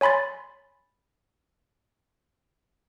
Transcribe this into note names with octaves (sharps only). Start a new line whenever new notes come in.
C#5 G#5 B5 C6 A6